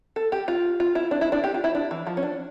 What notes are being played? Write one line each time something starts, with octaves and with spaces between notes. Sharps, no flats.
A4
G4
F4
F4
E4
D4
E4
D4
G4
F4
E4
D4
E3
F3
C#4
D4